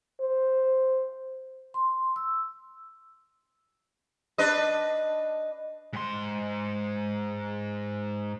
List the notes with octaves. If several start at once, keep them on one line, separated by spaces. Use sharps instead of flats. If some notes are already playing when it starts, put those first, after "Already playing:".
C5
C6
E6
D4 B4 D#5
G#2 C6